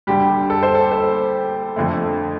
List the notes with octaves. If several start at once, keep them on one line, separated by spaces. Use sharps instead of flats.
D2 D3 G3 G4
A4
C5
A4
C5
F2 D3 A3